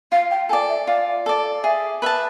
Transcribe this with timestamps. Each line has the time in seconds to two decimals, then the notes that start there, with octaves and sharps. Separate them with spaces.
0.12 F4 F5
0.31 G5
0.49 A4 G#5
0.53 D5
0.69 E5
0.87 F4 D5
1.26 A4 D5
1.64 G#4 E5
2.02 B4 E5 A5